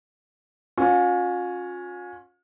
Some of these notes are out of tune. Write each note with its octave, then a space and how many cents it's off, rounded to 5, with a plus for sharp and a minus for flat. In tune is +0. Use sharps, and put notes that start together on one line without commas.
C#4 +0 F4 +40